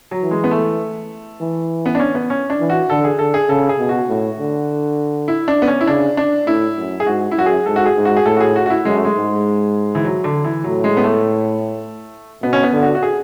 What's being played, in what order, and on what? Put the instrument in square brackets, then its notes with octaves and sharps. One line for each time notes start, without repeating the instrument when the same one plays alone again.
[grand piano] F#3
[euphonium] E3
[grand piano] G#3
B3
A3
[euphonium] E3
[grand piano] B3
D4
C#4
B3
C#4
D4
[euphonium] E3
[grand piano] F#4
[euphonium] D3 [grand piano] A4
[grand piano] G#4
[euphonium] D3 [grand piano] A4
[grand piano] G#4
[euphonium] C#3 [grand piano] A4
[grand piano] G#4
[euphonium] B2
[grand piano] F#4
[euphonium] A2
D3
[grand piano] E4
D4
B3
C#4
E4
[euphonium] C#3 [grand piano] D4
[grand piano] D4
[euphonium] A2 [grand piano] E4
[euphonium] F#2
[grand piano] G#4
[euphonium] G#2 [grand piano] F#4
[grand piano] E4
[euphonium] F#2 [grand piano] F#4
[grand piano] G#4
[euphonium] G#2 [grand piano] A4
[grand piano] F#4
G#4
[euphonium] G#2
[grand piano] F#4
G#4
[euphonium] A2 [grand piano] A4
[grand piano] F#4
G#4
F#4
F#4
E4
[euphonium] F#2 [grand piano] G#3
[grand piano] A3
G#3
[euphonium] G#2
[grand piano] E3
F#3
D3
E3
[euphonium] A2 [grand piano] F#3
[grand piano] G#3
B3
A3
[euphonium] B2 [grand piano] B3
[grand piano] C#4
B3
[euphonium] D3
[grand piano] F#4
F#4
G#4